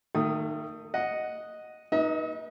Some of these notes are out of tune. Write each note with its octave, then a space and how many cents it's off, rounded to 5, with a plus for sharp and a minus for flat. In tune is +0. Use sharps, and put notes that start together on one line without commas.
D#3 -15 A3 +30 D#6 +0
D#5 +0 F#5 +0
D#4 +0 B4 -30 D#5 +45